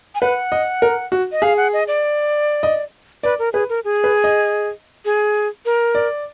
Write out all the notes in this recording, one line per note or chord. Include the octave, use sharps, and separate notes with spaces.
G#5
B4 F#5
D#5
A#4
F#4
D#5
G#4 F5
F#5
D#5
D5
D#5
B4 D5
A#4
G#4 B4
A#4
G#4
B4
D#5
G#4
A#4
D5